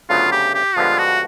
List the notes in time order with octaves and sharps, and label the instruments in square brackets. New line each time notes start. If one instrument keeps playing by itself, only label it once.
[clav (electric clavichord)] D2 C#3 F#3 B3 [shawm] F4
[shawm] G4
G4
[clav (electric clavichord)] G2 D3 F3 G#3 B3 [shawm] F4
[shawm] F#4